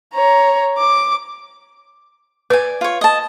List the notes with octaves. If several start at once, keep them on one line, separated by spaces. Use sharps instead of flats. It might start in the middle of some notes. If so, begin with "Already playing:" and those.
C#5 A#5
D6
B4 D5 G#5
F4 C#5
D#5 A5